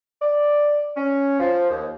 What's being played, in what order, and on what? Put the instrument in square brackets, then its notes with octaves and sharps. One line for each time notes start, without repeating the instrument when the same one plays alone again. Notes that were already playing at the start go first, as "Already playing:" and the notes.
[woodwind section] D5
C#4
F3
D#2